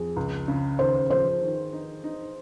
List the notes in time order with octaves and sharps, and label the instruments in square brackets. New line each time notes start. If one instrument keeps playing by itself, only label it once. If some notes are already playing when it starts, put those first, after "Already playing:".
Already playing: [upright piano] F2 [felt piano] G#4
[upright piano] C#2
C#3
[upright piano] D#2 [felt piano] C5
[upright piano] F3 [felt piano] C5
[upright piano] D#3
D#4
D#4